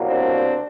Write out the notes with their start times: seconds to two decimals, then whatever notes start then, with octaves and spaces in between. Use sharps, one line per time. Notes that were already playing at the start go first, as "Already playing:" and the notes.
Already playing: C2 B2 F#3 A#3
0.09 C4 D4